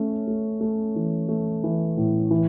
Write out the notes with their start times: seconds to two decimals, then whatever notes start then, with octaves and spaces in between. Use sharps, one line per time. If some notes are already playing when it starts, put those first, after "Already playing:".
Already playing: A3 C#4
0.27 A3
0.61 A3
0.96 E3
1.28 A3
1.64 E3
1.97 A2
2.31 E3